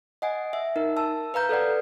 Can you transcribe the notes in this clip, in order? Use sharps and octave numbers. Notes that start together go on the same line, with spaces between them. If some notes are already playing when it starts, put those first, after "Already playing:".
D#5 F#5 G#5
E5
D#4 A#4
A5 E6
B4 F5 A#5 G6
A4 B4 D5 F#5